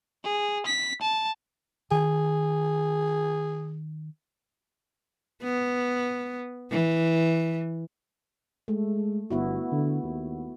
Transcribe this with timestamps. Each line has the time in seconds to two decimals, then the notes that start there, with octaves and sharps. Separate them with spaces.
0.24 G#4
0.66 B6
1.01 A5
1.91 D#3 G#4
5.43 B3
6.71 E3
8.68 G#3 A3
9.30 G1 B3 E4 F#4
9.72 D3
10.04 D#2